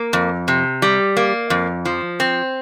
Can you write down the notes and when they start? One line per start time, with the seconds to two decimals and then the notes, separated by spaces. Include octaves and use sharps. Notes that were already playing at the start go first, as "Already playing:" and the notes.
Already playing: A#3
0.13 F2
0.48 C3
0.82 G3
1.17 A#3
1.50 F2
1.85 F3
2.20 C4